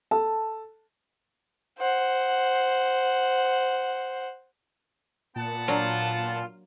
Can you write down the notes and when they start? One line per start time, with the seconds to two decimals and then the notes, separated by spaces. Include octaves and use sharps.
0.11 A4 A5
1.78 C5 F#5
5.36 A#2 B3 F#5 A5
5.68 F#3 A#3 D4 F4